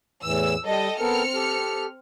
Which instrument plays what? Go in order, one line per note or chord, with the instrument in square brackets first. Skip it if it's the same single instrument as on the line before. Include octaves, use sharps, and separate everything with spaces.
[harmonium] E2 A2 E3 [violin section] E6
[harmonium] G3 [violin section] A4 D#5 G5
[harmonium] B3 A4 A#4 [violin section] C4 F6 C#7
[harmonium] G4 A4